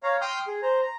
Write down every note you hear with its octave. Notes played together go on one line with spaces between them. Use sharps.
C#5 F5 A#5
G5 C6 D#6 F6 G6
G#4
C5 A#5
A#5